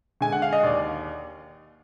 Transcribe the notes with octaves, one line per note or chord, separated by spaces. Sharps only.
D3 G#3 G#5
F#5
F5
D#5
D#2 D5